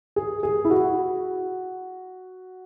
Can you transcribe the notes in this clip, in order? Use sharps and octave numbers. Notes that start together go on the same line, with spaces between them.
G#4
G#4
E4
F#4